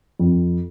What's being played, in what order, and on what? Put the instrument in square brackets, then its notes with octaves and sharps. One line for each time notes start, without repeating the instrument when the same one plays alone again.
[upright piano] F2